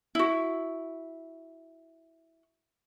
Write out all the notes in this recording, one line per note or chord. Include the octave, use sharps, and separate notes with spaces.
E4 F#4